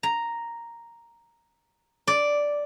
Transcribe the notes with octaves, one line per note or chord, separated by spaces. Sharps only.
A#5
D5